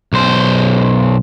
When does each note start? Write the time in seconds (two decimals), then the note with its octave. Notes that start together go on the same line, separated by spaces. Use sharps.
0.13 B1 C5